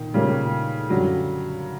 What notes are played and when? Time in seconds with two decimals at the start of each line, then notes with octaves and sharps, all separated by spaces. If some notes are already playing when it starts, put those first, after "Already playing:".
Already playing: A#2 D#3 A#3
0.14 A#2 C#3 G3 A#3 C#4
0.90 F#2 D3 F#3 G3